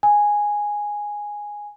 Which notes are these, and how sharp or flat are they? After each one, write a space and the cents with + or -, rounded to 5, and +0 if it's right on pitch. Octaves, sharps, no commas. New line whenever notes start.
G#5 -5